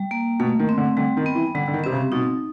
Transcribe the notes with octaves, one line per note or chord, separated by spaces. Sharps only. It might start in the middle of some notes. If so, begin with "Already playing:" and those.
Already playing: G3
A#3
B2 A3
D#3
C4
D3
D3 G3
D#3
B3
E3
D3 G3
D3
D#3
C3 C4
C#3
B2 D#4